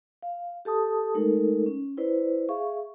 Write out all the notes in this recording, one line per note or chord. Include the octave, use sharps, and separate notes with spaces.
F5
G4 A4 A5 D#6
G#3 A3 D#4 A4 A#4
C#4
E4 B4 C5 D5
G#4 E5 F5 C#6